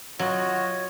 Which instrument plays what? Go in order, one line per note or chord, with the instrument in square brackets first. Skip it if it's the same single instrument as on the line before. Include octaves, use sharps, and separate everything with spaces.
[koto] F#3 [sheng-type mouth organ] F4 F#4 D#5 [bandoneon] C#5